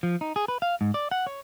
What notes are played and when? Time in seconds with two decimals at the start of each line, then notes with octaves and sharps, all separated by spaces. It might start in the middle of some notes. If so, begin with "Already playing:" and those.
0.03 F3
0.21 D#4
0.36 G#4
0.48 B4
0.62 F5
0.81 G#2
0.94 D5
1.11 F#5
1.27 C#5